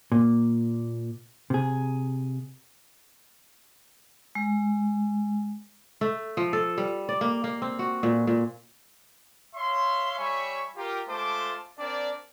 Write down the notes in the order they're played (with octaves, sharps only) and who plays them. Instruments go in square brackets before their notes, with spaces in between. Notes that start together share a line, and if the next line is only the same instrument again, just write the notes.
[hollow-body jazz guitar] A#2
C3 G#4
[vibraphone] G#3
[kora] A3
F3
A4
G3
D5
A#3
A#3
C4
F#4
A#2
A#2
[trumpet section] C#5 E5 F5 C6
G3 C#5 E5 G#5 B5 C#6
F4 G4 A#4
G#3 A3 F4 C5 A5 D6
C4 D4 A#4 D5